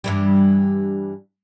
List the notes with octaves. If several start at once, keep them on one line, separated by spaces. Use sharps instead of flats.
G2 E3 G3